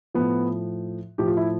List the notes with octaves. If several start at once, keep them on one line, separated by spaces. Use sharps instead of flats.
A2 F3 B3
A2 F3 G4
F4
E4